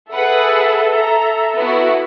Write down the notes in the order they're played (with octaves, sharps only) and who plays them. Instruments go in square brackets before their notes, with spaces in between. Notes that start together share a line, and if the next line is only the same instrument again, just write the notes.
[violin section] G#4 B4 F#5 [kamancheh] A4 E5
[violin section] A#5
B3 E4 F#4